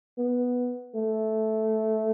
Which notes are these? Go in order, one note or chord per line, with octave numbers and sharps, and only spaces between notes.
B3
A3